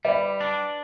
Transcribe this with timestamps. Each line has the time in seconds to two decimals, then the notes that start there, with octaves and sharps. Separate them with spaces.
0.05 G3 B4 D5
0.41 D4